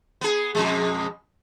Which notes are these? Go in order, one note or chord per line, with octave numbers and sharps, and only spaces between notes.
B3 G#4
F2 B2 G#3